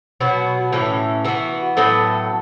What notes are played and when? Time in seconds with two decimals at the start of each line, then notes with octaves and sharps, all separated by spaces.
0.20 B2 F#3 B3 F#4
0.72 A2 E3 C#4
1.24 E3 B3 F#4
1.77 A2 F#3 B3 A4